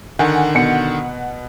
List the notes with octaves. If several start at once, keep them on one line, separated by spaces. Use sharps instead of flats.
D3 D#3 F#5 G#5
B2 F#5 C#7